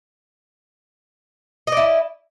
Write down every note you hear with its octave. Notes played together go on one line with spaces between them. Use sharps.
E4 D5 D#5